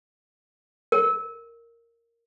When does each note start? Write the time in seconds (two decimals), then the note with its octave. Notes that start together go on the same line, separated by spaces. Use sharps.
0.92 A#4